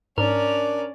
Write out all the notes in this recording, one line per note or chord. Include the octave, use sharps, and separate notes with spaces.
G#2 C#4 D4 A#4 D5